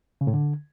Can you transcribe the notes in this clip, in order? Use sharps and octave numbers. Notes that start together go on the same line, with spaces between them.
C#3
A2
D3